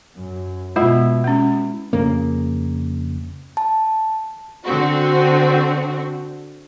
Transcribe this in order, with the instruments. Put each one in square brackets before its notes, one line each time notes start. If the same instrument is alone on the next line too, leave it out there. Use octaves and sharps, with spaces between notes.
[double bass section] F#2
[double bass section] B2 [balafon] G#3 F4 D#5 [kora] E4
[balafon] G#3 C#4
[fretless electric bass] F2 C#3 A#3
[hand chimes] A5
[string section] D3 C4 F#4